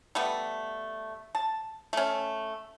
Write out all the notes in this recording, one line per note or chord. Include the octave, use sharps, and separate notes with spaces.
G3 A3 B3
A5
A3 C#4